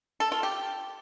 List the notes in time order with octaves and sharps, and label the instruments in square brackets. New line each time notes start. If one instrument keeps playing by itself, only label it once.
[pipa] A4
F4
G4